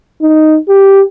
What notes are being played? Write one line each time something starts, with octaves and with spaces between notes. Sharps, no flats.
D#4
G4